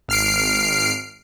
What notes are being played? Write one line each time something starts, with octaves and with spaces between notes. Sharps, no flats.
G#1 F6 C7 D7